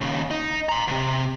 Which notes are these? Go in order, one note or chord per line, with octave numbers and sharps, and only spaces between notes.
D#2 C#3
D#4
A#5 C6
D2 C3